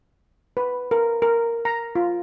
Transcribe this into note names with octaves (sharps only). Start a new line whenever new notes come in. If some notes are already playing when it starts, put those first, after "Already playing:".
B4
A#4
A#4
A#5
F4